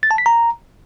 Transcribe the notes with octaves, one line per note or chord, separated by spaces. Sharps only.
A6
A5
B6
A#5